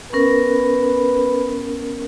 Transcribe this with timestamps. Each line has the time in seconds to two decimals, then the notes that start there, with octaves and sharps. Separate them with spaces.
0.13 B3 C#4 A#4 B4